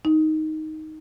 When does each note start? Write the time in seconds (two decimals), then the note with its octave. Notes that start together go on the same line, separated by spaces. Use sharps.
0.05 D#4